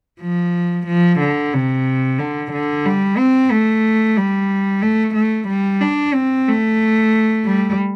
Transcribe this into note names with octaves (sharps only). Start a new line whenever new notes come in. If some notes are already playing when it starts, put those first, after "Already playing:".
F3
F3
D3
C3
D3
D3
G3
C4
A3
G3
A3
A3
G3
D4
C4
A3
G3